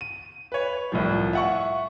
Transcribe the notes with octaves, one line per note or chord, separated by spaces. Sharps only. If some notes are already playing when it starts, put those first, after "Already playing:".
D#7
B4 C#5
C2 A2 F3
E5 F#5 C#6